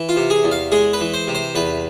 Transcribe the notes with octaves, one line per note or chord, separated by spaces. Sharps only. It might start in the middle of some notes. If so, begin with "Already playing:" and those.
Already playing: E3
F4
C3
G#4
E2
F5
G#3 G#4
B4
E3
C5
C3
C5
E2 B4